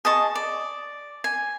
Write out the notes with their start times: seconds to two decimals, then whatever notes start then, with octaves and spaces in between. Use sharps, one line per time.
0.05 G#4 D#5 A5 C#6
0.35 D5
1.24 G#5